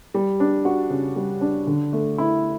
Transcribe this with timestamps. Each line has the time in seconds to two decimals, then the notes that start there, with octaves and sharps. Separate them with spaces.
0.14 G3
0.40 D4
0.65 F#4
0.90 C#3
1.16 G3
1.41 D4
1.67 D3
1.93 A3
2.18 E4